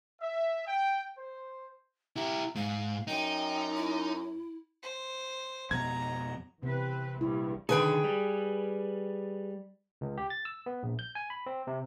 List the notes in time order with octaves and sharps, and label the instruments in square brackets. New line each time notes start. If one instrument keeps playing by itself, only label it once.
[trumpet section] E5
G5
C5
[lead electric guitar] E4 G4 [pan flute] A#5
[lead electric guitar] G#2 [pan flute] F5
[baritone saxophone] F#2 [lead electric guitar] D#4 [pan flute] G5
[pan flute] E4
[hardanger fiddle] C5
[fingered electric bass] F2 B2 [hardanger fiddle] A#5 [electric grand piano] G#6
[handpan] C3 B3 [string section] E3 C4 B4
[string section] A#1 G2 E3 [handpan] E4
[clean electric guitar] D3 D#3 A4 [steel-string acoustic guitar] G#4 B4 G5
[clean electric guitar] G3
[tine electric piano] C#2
G4
A6
E6
B3
A#1
G6
G#5
B5
C4
C3